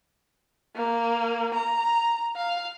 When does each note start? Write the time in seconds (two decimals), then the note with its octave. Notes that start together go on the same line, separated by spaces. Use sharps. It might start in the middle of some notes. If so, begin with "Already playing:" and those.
0.76 A#3
1.54 A#5
2.36 F5